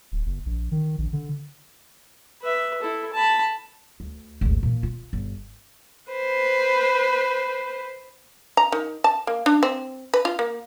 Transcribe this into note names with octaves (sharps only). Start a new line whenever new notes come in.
D1
F#1
A#1
D#3
A#1
D3
B4 E5
E4 A4
A5 B5
D2
G#1 D2
A#2 E3
F4
G1
B4 C5
A#5
D#3
A5
A#3
D4
C4
B4
F4
A#3